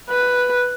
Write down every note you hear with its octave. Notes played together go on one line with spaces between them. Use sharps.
B4